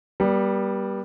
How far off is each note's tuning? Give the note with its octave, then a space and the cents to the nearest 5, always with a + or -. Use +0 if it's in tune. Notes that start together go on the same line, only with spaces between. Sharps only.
G3 +0 B3 -40